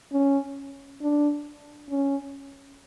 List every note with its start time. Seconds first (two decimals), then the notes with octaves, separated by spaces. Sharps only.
0.13 C#4
1.02 D4
1.90 C#4